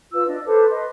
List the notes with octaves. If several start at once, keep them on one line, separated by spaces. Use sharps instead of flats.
F4 B4 E6
D4 D#5
A4 B4 C5 D6
B4 D#5 C6